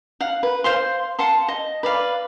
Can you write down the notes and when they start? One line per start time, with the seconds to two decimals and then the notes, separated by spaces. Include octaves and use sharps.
0.21 F5 F#5
0.43 B4
0.64 C5 F5 C6
1.19 F5 F#5 A5 C6
1.48 D#5
1.83 B4 D5 F5